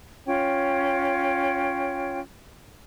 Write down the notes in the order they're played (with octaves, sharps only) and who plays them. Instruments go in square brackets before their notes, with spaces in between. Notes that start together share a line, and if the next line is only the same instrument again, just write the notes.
[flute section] C#4 F4 C#5 G5